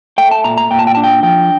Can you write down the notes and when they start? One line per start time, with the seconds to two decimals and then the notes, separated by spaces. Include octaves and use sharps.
0.18 A3 G5
0.31 A5
0.44 A#2 A#5
0.57 A#5
0.71 A#2 G5
0.79 A5
0.87 G5
0.95 D4 A5
1.04 G5
1.23 F3 G5